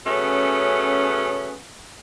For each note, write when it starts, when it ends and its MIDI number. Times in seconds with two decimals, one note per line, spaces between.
0.07 1.54 49
0.07 1.54 54
0.07 1.54 57
0.07 1.54 59
0.07 1.54 61